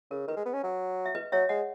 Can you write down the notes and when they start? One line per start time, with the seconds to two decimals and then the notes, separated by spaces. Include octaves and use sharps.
0.10 C#3 A#4
0.27 D#3 B4
0.36 G#3
0.45 B3
0.53 C#4
0.63 F#3
1.06 E5
1.15 B4 D#5
1.32 F#3 C#5 E5
1.49 G#3 D#5 F#5